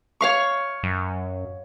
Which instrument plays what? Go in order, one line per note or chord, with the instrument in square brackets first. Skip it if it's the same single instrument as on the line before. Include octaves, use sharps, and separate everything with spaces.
[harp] C#5 F5 C#6
[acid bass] F#2